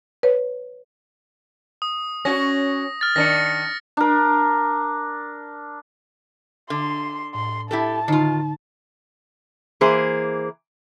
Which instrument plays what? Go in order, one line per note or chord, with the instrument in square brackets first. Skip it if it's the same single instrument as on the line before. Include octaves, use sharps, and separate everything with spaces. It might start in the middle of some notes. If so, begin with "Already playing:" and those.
[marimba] B4 C#5
[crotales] D#6
[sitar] C#4 F#4 [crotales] A#6
[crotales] F6 A6
[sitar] D#3 D4 [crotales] A#6 C#7
[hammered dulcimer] D4 A#4
[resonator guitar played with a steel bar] D3 [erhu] C6
[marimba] A2 [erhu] C6
[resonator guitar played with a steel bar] E4 G4 A4 [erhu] A5
[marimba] D3 D#4 [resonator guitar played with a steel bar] D#3 F4
[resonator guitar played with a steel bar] E3 A#3 G#4 C5